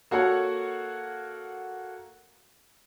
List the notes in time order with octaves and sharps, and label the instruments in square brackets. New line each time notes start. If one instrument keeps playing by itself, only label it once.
[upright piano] A#3 F#4 A4 C#5 F#5